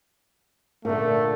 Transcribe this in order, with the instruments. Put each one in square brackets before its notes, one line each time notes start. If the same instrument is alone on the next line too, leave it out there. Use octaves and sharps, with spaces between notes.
[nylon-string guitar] A#2 D3 [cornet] A3